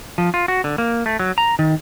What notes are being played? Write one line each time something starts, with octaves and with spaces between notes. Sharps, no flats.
F3
F4
F#4
D3
A#3
A3
F#3
A#5
D#3